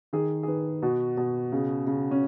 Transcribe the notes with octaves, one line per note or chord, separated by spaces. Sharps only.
D#3 G#4
G#4
D#3 B4
B2 F#4
B2
C#3
C#3
C#4